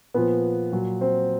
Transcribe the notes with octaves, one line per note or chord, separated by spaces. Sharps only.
A#2 F3 B3 B4
A#2 F#3
C4 C5